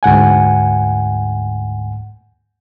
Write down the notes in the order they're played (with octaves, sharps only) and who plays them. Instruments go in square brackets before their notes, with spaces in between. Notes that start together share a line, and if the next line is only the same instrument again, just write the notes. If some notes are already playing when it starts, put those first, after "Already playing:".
[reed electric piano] D2 G#2 F#5 G#5